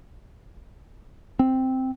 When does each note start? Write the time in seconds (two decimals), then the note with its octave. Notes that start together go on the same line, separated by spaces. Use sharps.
1.39 C4